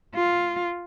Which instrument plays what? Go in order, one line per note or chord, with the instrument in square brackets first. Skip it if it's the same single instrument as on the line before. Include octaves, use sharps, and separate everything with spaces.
[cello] F4